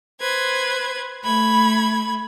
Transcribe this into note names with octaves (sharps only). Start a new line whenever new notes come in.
B4 C5 G#6
A3 B5 G#6